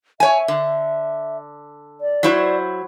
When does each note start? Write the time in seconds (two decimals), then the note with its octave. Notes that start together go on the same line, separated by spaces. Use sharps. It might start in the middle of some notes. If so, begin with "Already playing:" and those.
0.20 C#5 E5 G#5
0.48 D3
2.01 D5
2.23 F#3 E4 C5